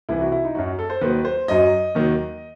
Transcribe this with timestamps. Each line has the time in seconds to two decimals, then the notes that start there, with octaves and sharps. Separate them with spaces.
0.09 C2 C3 E3 E4
0.21 F#4
0.32 E4
0.44 D#4
0.55 F#2 F#3 F#4
0.79 A4
0.90 C5
1.01 D#2 D#3 F#3 B4
1.25 C5
1.48 F#2 F#3 D#5
1.95 D#2 D#3 F#3